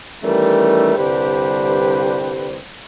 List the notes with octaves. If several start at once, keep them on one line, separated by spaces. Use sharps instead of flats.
D#3 E3 G3 A3 C#4 A#4
C2 G2 D3 G4 B4 C5